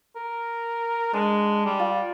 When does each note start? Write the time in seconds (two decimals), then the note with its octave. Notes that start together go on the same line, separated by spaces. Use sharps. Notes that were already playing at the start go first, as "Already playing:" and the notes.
0.16 A#4
1.13 G#3 D4
1.65 G3
1.79 F4